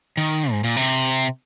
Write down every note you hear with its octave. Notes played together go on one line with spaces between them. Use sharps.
D#3
G#2
A#2
C3